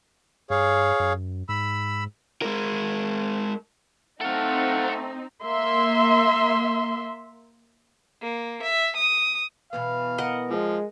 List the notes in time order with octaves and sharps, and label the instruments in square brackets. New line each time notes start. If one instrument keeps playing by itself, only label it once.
[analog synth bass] G2 [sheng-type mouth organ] G#4 C#5 F5
[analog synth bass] F#2
[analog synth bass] G#2 [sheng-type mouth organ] B5 E6
[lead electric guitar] G#3 A#4
[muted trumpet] A3 [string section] C4 D#4 [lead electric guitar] A4 F5 [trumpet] F#5
[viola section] A#3 E5 C6
[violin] A#3
E5
D#6
[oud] B2 E3 B3 [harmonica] F5
[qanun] A#4 D#5 F#5
[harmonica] F3 [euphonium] G#3